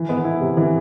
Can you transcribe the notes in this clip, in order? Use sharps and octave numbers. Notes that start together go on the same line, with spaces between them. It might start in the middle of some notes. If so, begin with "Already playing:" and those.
Already playing: E3
B3
E4
C3
E3